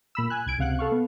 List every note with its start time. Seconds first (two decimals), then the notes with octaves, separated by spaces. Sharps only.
0.15 A#2 B5 E6
0.30 G#5 F#6
0.46 C2 G#6 D7
0.58 C#2 C3 F5 F#5 F#6
0.79 A4 F5 C#6
0.92 B3